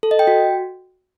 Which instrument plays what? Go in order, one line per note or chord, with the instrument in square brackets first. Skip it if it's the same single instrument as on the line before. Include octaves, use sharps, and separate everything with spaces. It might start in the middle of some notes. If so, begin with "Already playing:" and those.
[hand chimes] A4
D#5
G5
F#4